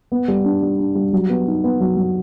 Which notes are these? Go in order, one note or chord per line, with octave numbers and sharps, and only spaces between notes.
B3
G3
D4
G3
D4
G3
F#3
B3
D#4
B3
F#3
F#3